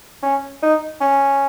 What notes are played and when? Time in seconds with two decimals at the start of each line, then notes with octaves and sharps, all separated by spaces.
0.23 C#4
0.63 D#4
1.01 C#4